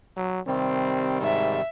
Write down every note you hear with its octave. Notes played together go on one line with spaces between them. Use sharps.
F#3
C3 D#3 G3 C4
G#2 E5